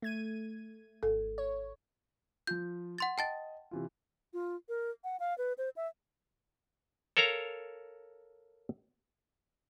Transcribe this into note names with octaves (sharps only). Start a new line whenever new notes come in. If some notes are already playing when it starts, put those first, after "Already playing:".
A3 G#6 D#7
G#1 A4
C#5
F3 F4 G6
F#5 C6 A6
D#5 G5 A5 A6
C3 E3 F4
F4
A#4
F#5
F5
B4
C5
E5
A4 A#4 C#5 F5 A#5